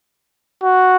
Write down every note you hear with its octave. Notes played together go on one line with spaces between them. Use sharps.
F#4